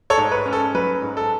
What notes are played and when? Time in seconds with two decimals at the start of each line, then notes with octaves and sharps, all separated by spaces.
0.10 A4 C#5
0.18 G#2
0.31 B4
0.46 C#4
0.53 A4
0.75 F#3 B4
1.02 G#2
1.17 A4